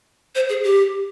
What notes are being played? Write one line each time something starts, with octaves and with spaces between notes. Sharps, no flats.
C5
G#4
G4